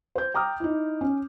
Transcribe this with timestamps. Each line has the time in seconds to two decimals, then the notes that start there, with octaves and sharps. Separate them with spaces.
0.16 C5 G6
0.34 G5 A#5 D6 D#6 F6
0.60 D#4 E4
1.01 C#4